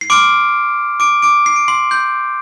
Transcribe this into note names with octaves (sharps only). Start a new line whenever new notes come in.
C7
C6 D6 F6 D7
D6 D7
D6 D7
C7
D7
C6 C7
C6 G6